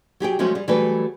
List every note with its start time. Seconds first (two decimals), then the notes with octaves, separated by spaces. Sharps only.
0.20 F#3 G4 G#4 G5
0.39 F3 F#3 G#3 A3 C#4 F#4
0.55 G3 G#4
0.68 E3 F#3 G3 A3 G#4 B4